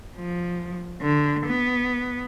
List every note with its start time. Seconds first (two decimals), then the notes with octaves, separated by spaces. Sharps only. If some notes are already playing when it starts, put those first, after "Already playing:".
0.16 F3
1.01 D3
1.46 B3